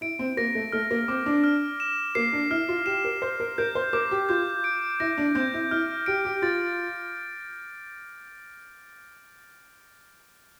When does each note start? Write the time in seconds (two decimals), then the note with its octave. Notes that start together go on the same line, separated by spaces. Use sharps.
0.01 E4 D7
0.19 C4
0.37 A#3 A#6
0.55 A3
0.72 A3 F6
0.91 A#3
1.08 C4 D6
1.26 D4
1.44 F6
1.80 E7
2.15 A#3 C7
2.33 D4
2.50 E4 F6
2.68 F4
2.86 G4 E7
3.05 A#4
3.22 C5 C7
3.40 A#4
3.58 A#4 G6
3.75 C5
3.93 A#4 D6
4.11 G4
4.29 F4 G6
4.64 D7
5.00 E4 A#6
5.18 D4
5.35 C4 G6
5.54 E4
5.71 E4 F6
6.06 G4 D7
6.25 G4
6.42 F4 A6